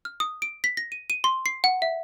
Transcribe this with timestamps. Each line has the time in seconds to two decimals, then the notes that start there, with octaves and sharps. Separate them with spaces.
0.05 F6
0.20 D#6
0.42 D7
0.64 B6
0.77 A#6
0.92 D#7
1.10 D#7
1.24 C6
1.46 C7
1.64 F#5
1.82 E5